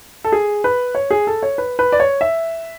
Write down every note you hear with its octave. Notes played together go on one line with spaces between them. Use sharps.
A4
G#4
B4
C#5
G#4
A4
C#5
B4
B4
D5
C#5
E5